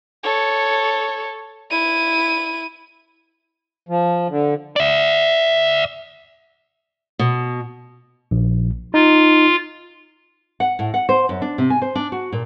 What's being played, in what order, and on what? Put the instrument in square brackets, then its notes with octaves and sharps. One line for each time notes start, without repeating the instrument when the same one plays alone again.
[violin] A4 C#5
E4 D#7
[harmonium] F3
D3
[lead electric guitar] D5 E5
[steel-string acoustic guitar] B2
[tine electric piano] A#1
[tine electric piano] D#4 [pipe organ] F4
[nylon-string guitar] F#5
A2
F#5
C5
F#2
D4
C3
G#5
C5
D4
F#4
A#2